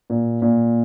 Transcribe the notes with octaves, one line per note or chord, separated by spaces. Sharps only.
A#2
A#2